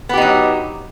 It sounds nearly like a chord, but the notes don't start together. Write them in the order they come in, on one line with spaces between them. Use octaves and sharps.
B3 G4 D#4 F#3